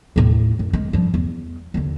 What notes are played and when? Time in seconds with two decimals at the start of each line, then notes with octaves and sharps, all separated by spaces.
0.16 D#2 A2
0.59 F#2
0.73 G#3 A#3
0.93 G2 F3
1.14 E2
1.74 D#2 D3